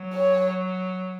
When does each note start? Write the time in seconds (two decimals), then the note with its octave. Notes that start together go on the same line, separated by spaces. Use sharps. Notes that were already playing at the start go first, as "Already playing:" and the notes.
Already playing: F#3
0.13 C#5